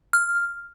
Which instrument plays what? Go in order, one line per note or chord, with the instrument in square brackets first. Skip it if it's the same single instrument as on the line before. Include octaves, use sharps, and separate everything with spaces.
[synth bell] F6